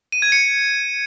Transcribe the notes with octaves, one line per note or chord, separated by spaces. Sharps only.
D#7
G#6
C#7